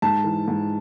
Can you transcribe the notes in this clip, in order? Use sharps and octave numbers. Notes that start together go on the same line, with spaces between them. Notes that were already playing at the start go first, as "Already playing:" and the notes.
G#2 A5
E3
G#2